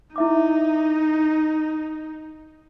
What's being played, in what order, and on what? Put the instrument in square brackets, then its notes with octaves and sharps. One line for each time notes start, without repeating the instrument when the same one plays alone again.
[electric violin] D#4 [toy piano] E4 E5 D6